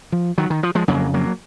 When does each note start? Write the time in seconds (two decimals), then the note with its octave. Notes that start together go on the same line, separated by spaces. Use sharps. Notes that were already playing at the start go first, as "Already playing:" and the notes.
0.12 F3
0.38 D#3 F#3
0.50 D#3
0.63 F3
0.75 F3 G#3
0.88 F2 C#3 F#3 A#3
1.14 F#3 A#3